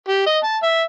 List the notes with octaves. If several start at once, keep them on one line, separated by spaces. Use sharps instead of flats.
G4
D#5
A5
E5